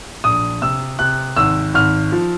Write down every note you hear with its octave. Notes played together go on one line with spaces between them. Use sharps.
A#1 D#6
C3 E6
C3 F#6
G#1 E6
G#1 F6
F3